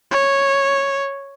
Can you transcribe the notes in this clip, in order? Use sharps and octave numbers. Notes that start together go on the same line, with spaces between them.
C#5